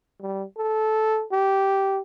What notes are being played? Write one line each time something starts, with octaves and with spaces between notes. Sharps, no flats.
G3
A4
G4